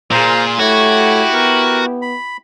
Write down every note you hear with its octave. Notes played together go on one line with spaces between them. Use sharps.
A#2 F4 G#4 C5 A#5
A3 E4 F#4 G4 C#5
B3 A#4
B5